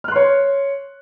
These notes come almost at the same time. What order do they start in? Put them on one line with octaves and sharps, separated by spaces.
F6 F#6 C6 C#5